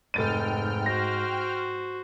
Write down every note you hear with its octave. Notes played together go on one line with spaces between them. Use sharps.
F1 G#2 G5 F6 A6 D#7
F#4 C5 A#6